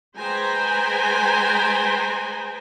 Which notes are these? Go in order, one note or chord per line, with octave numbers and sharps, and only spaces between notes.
G#3 B4 C5 G5 G#5 A#5